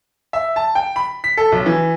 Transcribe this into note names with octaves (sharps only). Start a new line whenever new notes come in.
E5
A5
G5
B5
B6
A4
B1
E3